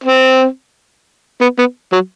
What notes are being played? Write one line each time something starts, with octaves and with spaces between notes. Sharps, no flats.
C4
B3
B3
F#3